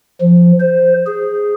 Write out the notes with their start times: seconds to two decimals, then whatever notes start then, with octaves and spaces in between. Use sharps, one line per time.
0.21 F3
0.60 C5
1.07 G#4